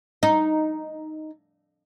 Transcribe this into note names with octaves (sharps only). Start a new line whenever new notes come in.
D#4